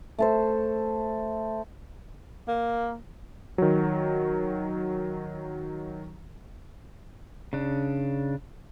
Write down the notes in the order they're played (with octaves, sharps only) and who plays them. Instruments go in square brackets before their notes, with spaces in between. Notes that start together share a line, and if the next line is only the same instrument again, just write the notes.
[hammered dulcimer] A3 A4 C5
[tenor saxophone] A#3
[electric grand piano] D#3 F#3
[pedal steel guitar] C#3 D4